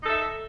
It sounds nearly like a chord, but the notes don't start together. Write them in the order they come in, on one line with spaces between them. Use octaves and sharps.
D#4 A4 E5